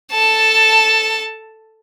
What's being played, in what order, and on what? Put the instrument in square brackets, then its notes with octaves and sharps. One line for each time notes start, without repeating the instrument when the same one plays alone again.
[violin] A4 A5